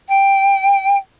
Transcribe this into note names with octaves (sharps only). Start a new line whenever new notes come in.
G5